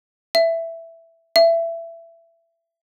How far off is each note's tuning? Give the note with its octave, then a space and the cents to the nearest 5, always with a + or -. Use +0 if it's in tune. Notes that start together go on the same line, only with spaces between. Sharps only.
E5 +5
E5 +20